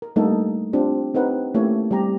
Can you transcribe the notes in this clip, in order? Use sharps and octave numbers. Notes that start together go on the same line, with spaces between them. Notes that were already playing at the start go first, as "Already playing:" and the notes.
A#4
G3 A3 A#3 D4 D#4 A4
C4 D4 F4 G4
C4 D#4 G4 A#4 B4 F#5
A3 A#3 C#4 E4 G4 C#5
G3 C4 G4 A#5